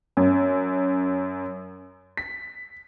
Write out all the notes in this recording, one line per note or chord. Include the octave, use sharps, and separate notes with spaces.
F#2
B6